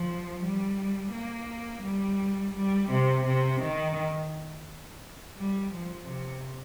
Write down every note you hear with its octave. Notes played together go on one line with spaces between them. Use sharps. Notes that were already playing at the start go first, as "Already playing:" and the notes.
Already playing: F3
G3
A#3
G3
G3
C3
C3
D#3
G3
F3
C3